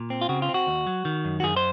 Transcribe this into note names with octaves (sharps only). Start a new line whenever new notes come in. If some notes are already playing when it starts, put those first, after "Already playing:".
Already playing: A#2
C4
F4
C#3 F#4
F4
C4
F#4
D#2
F#3
D#3
F#2
F#4
F#2 G#4
C5